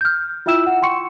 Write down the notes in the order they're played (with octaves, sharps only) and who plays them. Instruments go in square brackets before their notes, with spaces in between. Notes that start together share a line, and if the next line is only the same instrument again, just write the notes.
[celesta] F6 G6
E4 F4 E5 G5 E6 E7
F#5
F#5 G5 C6 C#6 C#7